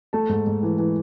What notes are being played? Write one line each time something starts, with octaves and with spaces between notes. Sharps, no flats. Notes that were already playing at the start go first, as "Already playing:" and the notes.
A3 A5
G#2
G#2
E3
E3